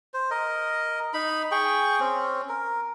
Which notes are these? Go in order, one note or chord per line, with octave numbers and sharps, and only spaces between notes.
C5
A#4 D#5
D#4 B5
G#4 G5 C#6
C4 C#4
A#4